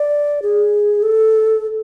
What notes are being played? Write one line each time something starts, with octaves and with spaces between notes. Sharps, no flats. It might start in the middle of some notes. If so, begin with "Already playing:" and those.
Already playing: D5
G#4
A4